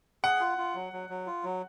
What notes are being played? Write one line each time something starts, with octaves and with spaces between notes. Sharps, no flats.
G#4 F#5
F4
F4
F#3
F#3
F#3
F4
F#3